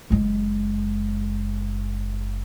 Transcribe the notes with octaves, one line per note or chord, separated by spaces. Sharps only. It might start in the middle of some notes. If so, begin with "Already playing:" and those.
F#1 G#3